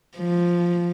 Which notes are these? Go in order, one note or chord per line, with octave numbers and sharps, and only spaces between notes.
F3